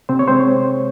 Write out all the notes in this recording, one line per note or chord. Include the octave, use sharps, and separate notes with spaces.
C3 C4 C5
C#5
G#3 C4 C5